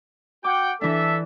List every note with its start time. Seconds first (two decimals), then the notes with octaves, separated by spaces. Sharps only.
0.44 F#4 F#5 G5 D6
0.81 E3 D4 A4 E5